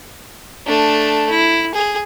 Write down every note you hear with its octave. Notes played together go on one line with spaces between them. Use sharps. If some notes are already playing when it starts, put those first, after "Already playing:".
A3 D4
E4
G#4